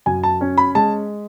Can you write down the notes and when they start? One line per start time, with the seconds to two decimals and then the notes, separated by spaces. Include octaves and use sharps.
0.06 F#2 G#5
0.23 A5
0.41 C#4
0.57 B5
0.75 G#3 A5